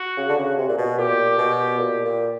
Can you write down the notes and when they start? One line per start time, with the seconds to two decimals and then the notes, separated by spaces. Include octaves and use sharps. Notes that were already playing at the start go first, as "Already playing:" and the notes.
Already playing: F#4
0.17 C#3
0.29 D3
0.38 C#3
0.58 C3
0.69 A#2
0.78 B2
0.98 A#2 G4
1.38 B2
1.78 A#2
2.05 A#2